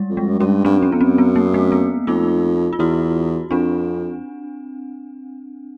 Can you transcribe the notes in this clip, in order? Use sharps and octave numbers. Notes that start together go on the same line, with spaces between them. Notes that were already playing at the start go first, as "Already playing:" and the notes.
Already playing: G3 G#3
F2
G#3
F#2
F#2 C#4
G2
G2 C4 D4
F#2 C#4
F2 B3
C4
F#2
B3
A#3
A3
B3
F2 D#4 F4
F4
E2 E4 F#4
F2 C4 D4